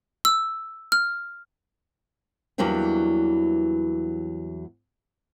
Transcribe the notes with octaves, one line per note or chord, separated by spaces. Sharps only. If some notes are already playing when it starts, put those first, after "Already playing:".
E6
F6
E2 E3 F#3 G3 A#3 D4